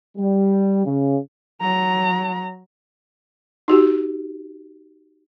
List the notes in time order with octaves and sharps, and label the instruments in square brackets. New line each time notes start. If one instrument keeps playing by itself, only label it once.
[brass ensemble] G3
C#3
[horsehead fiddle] F#3 A#5
[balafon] D#4 F#4 G4